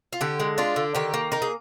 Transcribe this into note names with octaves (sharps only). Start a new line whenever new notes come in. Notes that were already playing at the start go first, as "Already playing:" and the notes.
F4
D3 G4
G#3
D4 F4
D3
D#3 G4
A#3
D#4 A#4
G#4